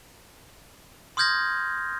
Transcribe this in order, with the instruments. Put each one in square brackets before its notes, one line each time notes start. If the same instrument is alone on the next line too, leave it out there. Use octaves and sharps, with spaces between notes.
[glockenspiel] C6 D#6 F6 G6 G#6 A#6